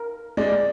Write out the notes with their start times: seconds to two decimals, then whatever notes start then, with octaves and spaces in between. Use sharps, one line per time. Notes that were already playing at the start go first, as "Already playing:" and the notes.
Already playing: A#4
0.37 G#3 D5